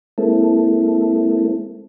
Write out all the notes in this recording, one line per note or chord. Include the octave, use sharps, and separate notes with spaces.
G#3 A#3 C4 E4 A4